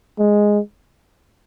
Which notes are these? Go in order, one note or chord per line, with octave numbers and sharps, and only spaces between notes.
G#3